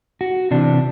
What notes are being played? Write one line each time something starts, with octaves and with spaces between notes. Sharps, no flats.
F#4
C3 E3 D4